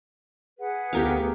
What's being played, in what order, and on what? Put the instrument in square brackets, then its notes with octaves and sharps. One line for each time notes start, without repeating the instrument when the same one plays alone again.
[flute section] G#4 B4 F#5
[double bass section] D2 B3 [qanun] G4 A#4 F5